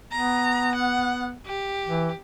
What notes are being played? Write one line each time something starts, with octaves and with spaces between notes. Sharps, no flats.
B3 A#5
F#5
G4
E3